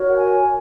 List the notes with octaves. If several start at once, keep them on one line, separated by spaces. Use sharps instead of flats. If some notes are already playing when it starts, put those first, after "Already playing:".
Already playing: F#4 A#4 C#5
F#5
G#5